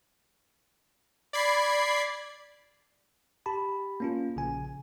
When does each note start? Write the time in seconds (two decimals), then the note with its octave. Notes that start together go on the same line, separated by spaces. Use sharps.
1.33 D5 B5 G#6 C7
3.46 G4 A5 B5
4.00 A#3 C#4 F4
4.36 A#1 C#3 G#5